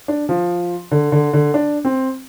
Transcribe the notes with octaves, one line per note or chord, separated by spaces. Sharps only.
D4
F3
D3
D3
D3
D4
C4